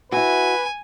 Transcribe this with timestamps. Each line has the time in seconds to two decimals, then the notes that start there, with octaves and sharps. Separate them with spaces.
0.12 E4 F#4 B4 G#5